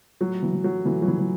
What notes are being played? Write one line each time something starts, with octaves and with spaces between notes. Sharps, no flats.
A2 F#3
E3
E3
F#3
A2 E3
F#3
E3
E3